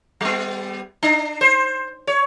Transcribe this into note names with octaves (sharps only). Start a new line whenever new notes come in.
G3 B3
D4
C5
C#5